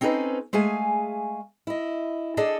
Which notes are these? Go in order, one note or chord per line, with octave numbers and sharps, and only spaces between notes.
C4 C#4 D#4 A4 B4 C5
G#3 A3 G#4 F5 G#5
E4 D#5
D4 G#4 A4 D5 D#5